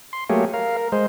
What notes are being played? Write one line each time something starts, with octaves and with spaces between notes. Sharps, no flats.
C6
F#3 A3 A#3 G4 G#4 C#5
A#4 F5
A#4
G#3 C5